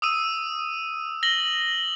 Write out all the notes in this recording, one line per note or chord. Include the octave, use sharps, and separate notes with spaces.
D#6 E6 D#7
A#6 F#7 G7